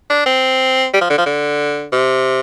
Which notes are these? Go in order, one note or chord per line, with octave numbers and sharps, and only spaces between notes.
D4
C4
G3
F3
D3
F3
D3
C3